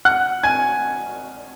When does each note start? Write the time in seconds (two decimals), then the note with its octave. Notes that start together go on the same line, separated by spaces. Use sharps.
0.05 F#5 F#6
0.43 G#5 G#6